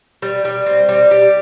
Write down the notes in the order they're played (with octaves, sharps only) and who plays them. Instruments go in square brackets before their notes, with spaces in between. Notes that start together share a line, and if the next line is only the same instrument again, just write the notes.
[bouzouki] G3
G3
C4
G3
G4